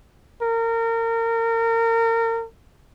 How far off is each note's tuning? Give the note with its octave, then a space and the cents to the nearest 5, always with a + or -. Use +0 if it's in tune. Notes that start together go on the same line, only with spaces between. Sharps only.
A#4 -30